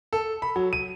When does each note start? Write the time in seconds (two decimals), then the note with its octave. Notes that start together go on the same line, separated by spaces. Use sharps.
0.13 A4
0.42 B5
0.56 F#3
0.73 D#7